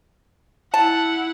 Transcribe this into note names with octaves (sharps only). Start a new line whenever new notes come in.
E4 F#5 A5